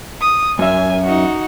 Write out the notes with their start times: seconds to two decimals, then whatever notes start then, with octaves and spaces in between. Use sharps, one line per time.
0.21 D#6
0.59 F#2 E5 G#5
1.04 D#4 F#4